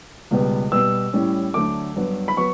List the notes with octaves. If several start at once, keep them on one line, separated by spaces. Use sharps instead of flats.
C#2 B2 G3 B3
B2 G3 B3 E6
A2 G3 C#4
D2 D3 F#3 A3 D6
G2 F#3 B3
B5
F#3 B3 C#6